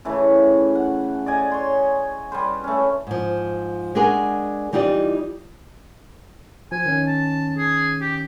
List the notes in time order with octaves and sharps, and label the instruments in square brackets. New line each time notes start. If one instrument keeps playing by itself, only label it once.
[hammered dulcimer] C#3 E3 A3
F#5
D5 D#5 G#5
C#5 C6
G3 B4 C5
A3 C#4
[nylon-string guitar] G#2 F3
G#3 D4 F#4 G#4 A#4 G#5
E3 G3 D#4 F4 G4 D5
[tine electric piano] F3 [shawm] G#5
[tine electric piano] D#3 C#4
[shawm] A5
G#4
G4